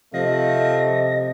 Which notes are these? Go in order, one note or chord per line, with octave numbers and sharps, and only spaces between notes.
C3 F3 A3 D#5 A#6